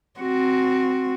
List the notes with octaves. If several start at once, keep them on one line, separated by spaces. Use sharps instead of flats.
C4 F#4